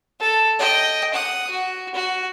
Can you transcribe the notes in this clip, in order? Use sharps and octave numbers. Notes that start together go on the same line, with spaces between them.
A4
D#5 G5
F#5 D#6
F#4
F#4